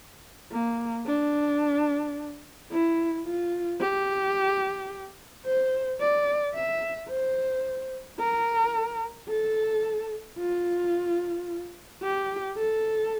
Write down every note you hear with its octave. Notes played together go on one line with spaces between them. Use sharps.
A#3
D4
E4
F4
G4
C5
D5
E5
C5
A#4
A4
F4
G4
A4